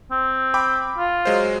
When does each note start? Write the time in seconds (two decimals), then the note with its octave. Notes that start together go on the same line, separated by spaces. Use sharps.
0.11 C4
0.54 G5 B5 D6
0.98 F4
1.25 F#3 G#3 C5